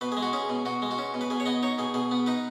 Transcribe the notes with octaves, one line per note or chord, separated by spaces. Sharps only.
B2 B4
G#3 G#4
F#4
C#4 G#4
B2
B2 F#4
G#3
F#4
C#4
B2
B4
B2 G#4
C#5
B3 D#5
D#4 C#5
B2 G#4
B2 G#4
B3
D#4 B4